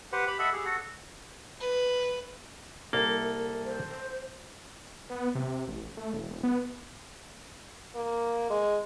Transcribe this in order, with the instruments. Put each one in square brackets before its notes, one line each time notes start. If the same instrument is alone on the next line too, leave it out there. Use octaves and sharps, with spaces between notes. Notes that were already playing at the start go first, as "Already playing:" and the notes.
[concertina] G4 B4 C5 F#5
G4 B5
A4 D#5 E5 F#5 B5 E6
G4 G#4
F#4 A4 F#5
[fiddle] B4
[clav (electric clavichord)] C2 A#3 A#4 [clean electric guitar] A4
[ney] C5
[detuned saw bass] B3
C3
A1
A3
E1
B3
[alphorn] A#3
G#3